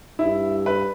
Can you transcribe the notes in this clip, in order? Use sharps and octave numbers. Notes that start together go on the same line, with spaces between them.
G2 E4
B4